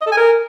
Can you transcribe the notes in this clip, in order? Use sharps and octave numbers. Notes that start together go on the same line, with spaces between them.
D#5
A4
G#5
A#4